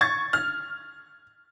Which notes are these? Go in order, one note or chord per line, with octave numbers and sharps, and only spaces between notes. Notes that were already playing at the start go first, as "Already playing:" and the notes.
C#6 G#6 A6
F6